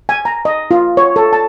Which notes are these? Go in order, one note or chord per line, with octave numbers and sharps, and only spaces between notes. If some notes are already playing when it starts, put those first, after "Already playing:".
G#5
A#5
D#5
F4
C#5
A4
A5